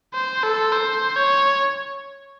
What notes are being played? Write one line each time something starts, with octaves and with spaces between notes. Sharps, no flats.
C5
A4
C5
C#5